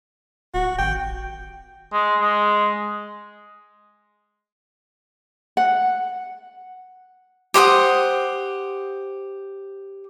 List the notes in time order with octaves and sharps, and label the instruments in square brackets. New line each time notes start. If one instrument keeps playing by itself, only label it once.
[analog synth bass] D1 [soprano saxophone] F#4
[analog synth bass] G#1 [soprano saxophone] G5
[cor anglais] G#3
G#3
[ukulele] F#5
[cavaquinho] G4 C5 F#5 D#6